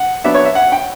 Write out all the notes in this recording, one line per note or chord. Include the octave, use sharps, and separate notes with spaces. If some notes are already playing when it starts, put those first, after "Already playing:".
Already playing: F#5
F#3 B3 D4 E5
C#5
E5
F#5
G5